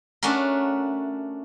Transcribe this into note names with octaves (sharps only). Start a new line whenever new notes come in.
A3 C#4 D4 F#4 A#4